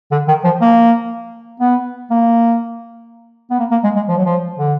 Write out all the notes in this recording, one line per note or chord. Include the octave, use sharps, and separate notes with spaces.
D3
D#3
F3
A#3
B3
A#3
B3
A#3
A#3
G#3
G#3
F3
F#3
F3
D3